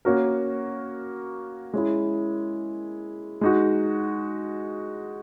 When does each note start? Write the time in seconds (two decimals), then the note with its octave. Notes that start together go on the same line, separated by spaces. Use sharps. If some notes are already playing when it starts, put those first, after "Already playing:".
0.05 A#3 C#4 F#4 A#4
1.74 G#3 C#4 E4
3.41 G#3 D#4 F#4